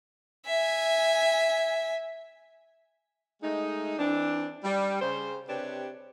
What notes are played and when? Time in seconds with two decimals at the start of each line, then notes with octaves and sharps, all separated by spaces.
0.46 E5 G#5
3.43 G#3 A3 D#4
3.99 E3 C4 D4
4.64 G3
5.02 C#3 C5
5.49 C3 D4 G4 B4 C#5